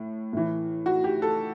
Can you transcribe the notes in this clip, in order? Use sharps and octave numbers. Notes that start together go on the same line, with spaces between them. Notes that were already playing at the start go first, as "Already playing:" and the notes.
Already playing: A2
A2 E3
F#4
G4
A4